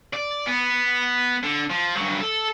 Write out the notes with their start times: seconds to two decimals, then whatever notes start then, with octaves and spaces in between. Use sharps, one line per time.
0.14 D5
0.47 B3
1.44 D3
1.70 F3
1.96 G2 F#3
2.21 A4